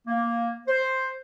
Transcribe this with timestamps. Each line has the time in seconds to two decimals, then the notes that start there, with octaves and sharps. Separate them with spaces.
0.07 A#3
0.67 C5